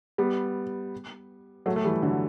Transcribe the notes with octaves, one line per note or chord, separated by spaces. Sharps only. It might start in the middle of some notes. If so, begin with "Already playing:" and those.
G3 B3
F#3 A3
A3
E3 G3
D3 F#3